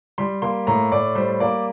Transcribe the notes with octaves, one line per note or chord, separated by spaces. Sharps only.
G3 C6
A#3 C6
A2 A#5
A2 D5
G3 C5
A#3 D5